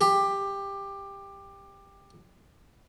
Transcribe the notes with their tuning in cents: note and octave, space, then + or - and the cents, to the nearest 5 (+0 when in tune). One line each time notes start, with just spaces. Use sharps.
G4 +15